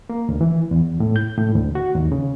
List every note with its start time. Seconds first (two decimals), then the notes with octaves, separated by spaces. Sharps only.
0.10 A#3
0.29 D2
0.41 E3
0.71 E2
1.00 A2
1.16 G6
1.38 A2
1.55 D2
1.75 F#4
1.95 D#2
2.12 C#3